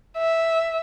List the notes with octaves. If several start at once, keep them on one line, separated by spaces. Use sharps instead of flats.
E5